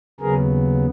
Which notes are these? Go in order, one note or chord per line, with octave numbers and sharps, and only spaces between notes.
D#2 C#3 F#3 B3 G#4 A#4